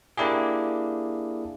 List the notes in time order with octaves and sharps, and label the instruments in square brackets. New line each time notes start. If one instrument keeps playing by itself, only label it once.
[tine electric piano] A#3 D4 E4 G4 G#4